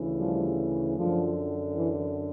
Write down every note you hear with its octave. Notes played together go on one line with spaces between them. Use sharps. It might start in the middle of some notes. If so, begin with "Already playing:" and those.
Already playing: D2 C#3 E3
F3 G3
F#2 D3 F3
E3